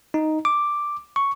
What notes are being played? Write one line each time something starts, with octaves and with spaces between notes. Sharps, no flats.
D#4
D6
C#6